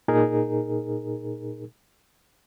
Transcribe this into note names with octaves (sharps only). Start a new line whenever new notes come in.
A#2 D#4 G#4 A#4